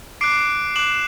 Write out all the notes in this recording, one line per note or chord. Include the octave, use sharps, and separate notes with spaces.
D6 F#6 C7 D7
D6 F#6 E7 F#7